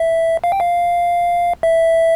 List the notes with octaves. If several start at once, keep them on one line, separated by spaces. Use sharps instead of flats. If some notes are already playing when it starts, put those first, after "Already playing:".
Already playing: E5
F5
G5
F5
E5